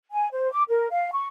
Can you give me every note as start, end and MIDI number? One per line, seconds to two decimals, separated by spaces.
0.12 0.28 80
0.32 0.50 72
0.51 0.62 86
0.68 0.86 70
0.90 1.09 77
1.13 1.28 85